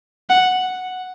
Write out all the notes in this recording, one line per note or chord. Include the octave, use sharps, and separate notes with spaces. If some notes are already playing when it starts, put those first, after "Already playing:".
F#5